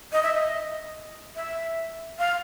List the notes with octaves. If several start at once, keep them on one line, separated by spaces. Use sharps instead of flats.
D#5
E5
D#5
E5
F5